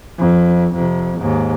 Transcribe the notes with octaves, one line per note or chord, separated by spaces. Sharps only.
F2
F2 C3
D#2 G#2